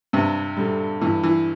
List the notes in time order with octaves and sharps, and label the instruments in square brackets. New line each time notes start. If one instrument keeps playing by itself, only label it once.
[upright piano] G2 [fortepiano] C3
[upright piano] D3 G3
[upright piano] G2 [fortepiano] E3
[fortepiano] E3